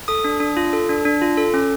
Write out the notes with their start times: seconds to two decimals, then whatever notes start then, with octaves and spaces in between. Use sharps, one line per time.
0.08 A4 D#6
0.24 D4
0.40 D4
0.57 F4
0.73 A4
0.89 D4
1.05 D4
1.21 F4
1.37 A4
1.54 C#4